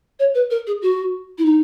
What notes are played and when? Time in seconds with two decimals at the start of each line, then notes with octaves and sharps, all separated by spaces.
0.19 C#5
0.35 B4
0.51 A#4
0.67 G#4
0.82 F#4
1.38 E4
1.45 D#4